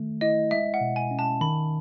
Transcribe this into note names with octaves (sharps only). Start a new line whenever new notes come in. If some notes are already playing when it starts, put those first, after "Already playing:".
Already playing: D#3 A3
E4 D#5
G#3 E5
F#5
B2
G#5
C#4
A5
D#3 B5